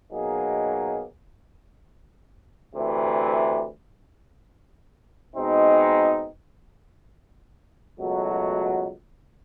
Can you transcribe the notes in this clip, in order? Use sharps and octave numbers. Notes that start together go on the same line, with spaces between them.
B2 F#3 A#3 D#4 G#4
D2 C3 E3
B2 G#3 C4 D#4
C#2 B2 F#3 A3